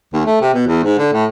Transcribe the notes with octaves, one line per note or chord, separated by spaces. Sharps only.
D#2
A3
C3
B2
E2
G#2
D3
A2